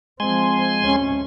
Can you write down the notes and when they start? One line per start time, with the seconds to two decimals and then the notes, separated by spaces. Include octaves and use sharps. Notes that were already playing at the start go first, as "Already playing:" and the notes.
0.20 F3 G#3 C4 G#5 C6
0.80 D2 C#4